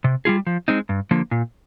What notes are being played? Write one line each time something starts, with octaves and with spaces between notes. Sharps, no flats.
C3
G3 A#3 F4 G#4
F3
G#3 C4 D#4
G2
D3 F3 A#3
A#2